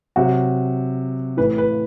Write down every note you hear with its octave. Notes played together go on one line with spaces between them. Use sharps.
C3 F#3 F#4
A2 E3 B4
B4